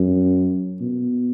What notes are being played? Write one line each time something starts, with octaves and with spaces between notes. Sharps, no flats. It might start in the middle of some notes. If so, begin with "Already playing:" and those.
Already playing: F#2
B2